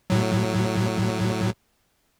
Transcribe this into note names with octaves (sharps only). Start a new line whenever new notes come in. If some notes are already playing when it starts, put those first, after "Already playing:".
A2 F#3